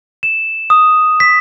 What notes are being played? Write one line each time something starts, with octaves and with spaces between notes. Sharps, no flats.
E7
D#6
B6